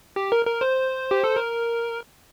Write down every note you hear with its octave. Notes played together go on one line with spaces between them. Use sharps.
G4
A#4
A#4
C5
G4
A4
A#4